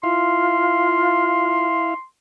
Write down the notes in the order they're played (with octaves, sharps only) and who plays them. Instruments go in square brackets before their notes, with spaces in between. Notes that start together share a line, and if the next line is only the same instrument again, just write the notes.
[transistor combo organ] E4 F5 [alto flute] F4 [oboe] C6